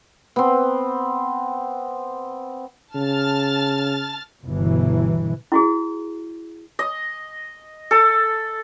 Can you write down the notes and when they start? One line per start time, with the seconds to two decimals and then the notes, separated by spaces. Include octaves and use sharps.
0.36 B3 C4
2.95 C#3 A5 F6 A6
4.43 G1 B2 E3
5.52 E4 F#4 G#4
6.79 D#5
7.91 A4